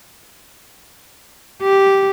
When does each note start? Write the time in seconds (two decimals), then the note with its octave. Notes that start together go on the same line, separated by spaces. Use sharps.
1.62 G4